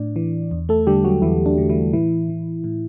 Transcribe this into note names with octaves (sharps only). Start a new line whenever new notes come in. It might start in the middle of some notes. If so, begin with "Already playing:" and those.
Already playing: A2 D4 D5
E3
E2
A3 A4
D3 G3 G4
F#3 F#4
E2 E3 E4
D4
D3
E3 E4
A2 E3 E4
E3
A2